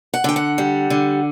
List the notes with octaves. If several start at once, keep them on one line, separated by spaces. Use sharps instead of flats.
F#5
D3 G5
F#5
G3
D3